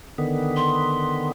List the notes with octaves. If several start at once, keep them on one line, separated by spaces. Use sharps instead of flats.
D3 D#3 B3
C6